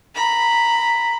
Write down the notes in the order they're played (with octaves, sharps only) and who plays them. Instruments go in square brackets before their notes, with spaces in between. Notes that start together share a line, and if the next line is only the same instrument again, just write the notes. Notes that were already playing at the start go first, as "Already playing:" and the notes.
[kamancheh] A#5 B5